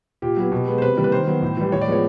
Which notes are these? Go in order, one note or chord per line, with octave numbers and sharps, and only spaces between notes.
A#2 G4
F#3 B3
B2
G#3 B3
C5
C3 B4
E3 G3 A#3
B4
D#3 C5
F#3 B3
A2
E3 G3
A2 C#5
D5
F3 G#3 B3 C#5